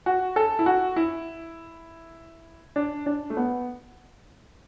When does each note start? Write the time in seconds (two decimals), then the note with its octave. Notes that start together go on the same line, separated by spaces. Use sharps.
0.06 F#4
0.36 A4
0.59 E4
0.66 F#4
0.96 E4
2.76 D4
3.06 D4
3.30 A3
3.37 B3